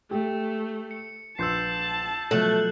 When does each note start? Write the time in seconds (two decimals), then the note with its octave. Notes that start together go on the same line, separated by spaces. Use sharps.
0.11 A3 G4
0.91 C#7
1.39 A#1 B4 A5 C6 E6 G6 C7
2.31 B2 F3 F#3 A3 E6 F#6 F#7